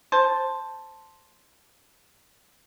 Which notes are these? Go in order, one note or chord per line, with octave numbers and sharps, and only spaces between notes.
C5 A5